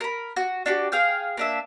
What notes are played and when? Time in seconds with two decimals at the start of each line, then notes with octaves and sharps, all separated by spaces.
0.01 A#4 B5
0.36 F#4
0.66 D4 F#4 G4
0.92 G#4 F5 G5
1.37 A#3 D4 E5